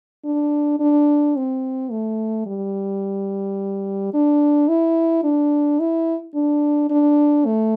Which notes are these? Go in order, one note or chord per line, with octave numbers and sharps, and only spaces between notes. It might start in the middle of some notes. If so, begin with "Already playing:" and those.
D4
D4
C4
A3
G3
D4
E4
D4
E4
D4
D4
A3